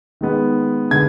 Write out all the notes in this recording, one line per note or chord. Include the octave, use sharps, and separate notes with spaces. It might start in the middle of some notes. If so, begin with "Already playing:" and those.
D#3 G#3 B3
D3 G#3 B3 G#6